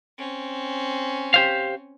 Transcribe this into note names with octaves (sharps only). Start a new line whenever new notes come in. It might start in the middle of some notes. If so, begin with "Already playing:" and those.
C4 C#4
G4 C5 F5